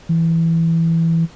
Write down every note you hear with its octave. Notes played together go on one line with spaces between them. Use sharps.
E3